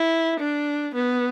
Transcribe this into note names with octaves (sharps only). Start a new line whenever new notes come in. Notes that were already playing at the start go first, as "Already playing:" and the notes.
Already playing: E4
D4
B3